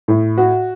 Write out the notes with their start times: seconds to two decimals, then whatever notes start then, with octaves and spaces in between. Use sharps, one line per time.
0.08 A2
0.38 F#4